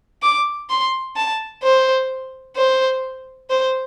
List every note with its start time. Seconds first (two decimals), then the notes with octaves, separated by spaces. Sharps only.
0.23 D6
0.70 C6
1.16 A5
1.63 C5
2.56 C5
3.50 C5